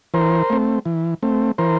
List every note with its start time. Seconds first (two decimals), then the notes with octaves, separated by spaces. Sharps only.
0.14 E3 A#4 C5
0.50 A3 C4
0.86 E3
1.23 A3 C4
1.58 E3 A#4 C5